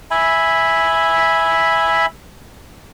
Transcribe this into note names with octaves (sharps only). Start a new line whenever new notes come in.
E5 G#5 B5